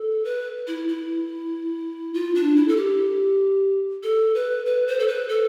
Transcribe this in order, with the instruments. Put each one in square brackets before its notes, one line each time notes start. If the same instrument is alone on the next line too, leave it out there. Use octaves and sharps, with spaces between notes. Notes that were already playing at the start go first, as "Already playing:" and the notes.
Already playing: [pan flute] A4
B4
E4
E4
F4
D4
E4
A4
G4
A4
B4
B4
C5
A4
B4
A4